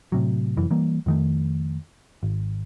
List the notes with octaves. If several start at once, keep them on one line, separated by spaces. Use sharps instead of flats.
A2 C3 F#3
F1 F#2 E3
E3 G3 A#3
F2 D#3 A3
G#1